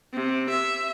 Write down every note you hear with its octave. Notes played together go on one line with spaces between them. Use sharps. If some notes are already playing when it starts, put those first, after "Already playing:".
C3
E5